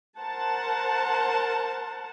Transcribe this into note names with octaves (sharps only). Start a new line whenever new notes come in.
A#4 C5 F#5 A5 A#5